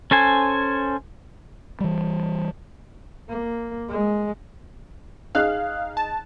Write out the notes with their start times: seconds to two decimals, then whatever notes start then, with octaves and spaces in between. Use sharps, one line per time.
0.11 C#4 A4 C5 G#5
1.80 E3 G3
3.29 A#3
3.89 G#3
5.35 D#4 G#4 F5 F#6
5.97 A5